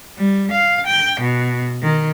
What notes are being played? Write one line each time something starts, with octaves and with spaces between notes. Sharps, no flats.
G3
F5
G5
B2
D#3